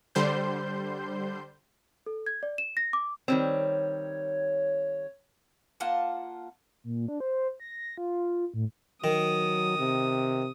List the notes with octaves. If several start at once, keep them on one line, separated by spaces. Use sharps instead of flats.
D3 G3 C5 C6 G6
A4
G#6
D5
E7
A#6
D6
D#3 G3 C4 C#5
A#3 F4 F#5 A5
A#2
D4
C5
A#6
F4
A2
D#3 F#3 D#6
C3